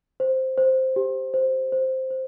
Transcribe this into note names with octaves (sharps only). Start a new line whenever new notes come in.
C5
C5
G4
C5
C5
C5